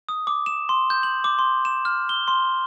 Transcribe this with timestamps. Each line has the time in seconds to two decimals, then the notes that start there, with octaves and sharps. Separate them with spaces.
0.09 D#6
0.27 D6
0.46 E7
0.69 C6
0.90 G6
1.03 F#7
1.24 D6
1.39 C6
1.65 E7
1.85 F6
2.09 G7
2.28 C6